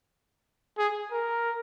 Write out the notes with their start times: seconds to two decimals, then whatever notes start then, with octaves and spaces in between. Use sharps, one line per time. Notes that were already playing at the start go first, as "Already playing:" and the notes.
0.78 G#4
1.12 A#4